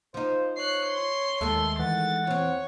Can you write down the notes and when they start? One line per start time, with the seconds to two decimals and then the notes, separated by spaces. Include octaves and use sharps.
0.14 F3 D#4 C5
0.57 C#5 F#6 C7
0.88 C6
1.41 D#2 D#3 G#3 A3 A4
1.79 E3 F#5 A6
2.27 E2 C4 C#5